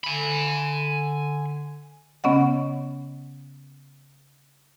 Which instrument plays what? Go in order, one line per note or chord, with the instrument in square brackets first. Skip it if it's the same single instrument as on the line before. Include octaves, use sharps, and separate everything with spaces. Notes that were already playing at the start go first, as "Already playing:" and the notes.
[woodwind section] D3 [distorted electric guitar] G#5 B5
[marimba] C#3 B3 C#4 D#5 F#5